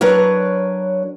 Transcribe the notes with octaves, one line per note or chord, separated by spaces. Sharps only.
F#3 D4 A#4 B4 C#5